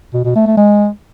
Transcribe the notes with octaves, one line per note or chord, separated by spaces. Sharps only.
B2
B2
A3
A3
G#3